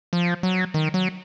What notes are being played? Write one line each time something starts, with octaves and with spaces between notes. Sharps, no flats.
F3
F#3
D#3
F#3